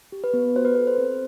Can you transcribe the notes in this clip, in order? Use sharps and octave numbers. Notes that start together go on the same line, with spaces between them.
G4
B4
B3
F#4 C5
B4
A4 C5
C5
C4